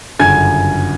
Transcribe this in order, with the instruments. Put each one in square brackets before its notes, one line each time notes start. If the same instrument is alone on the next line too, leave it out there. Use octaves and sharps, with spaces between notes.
[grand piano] G1 F#2 C#3 G#5 G#6